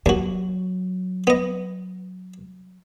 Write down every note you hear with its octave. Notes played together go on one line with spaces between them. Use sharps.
D#2 F#3 F#4
B3 D#5